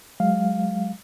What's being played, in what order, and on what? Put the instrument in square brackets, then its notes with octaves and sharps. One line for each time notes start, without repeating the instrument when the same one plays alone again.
[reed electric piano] F#3 G#3 F5